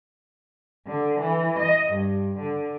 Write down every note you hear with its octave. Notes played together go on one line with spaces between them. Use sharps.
D3
E3
D#5
G2
D3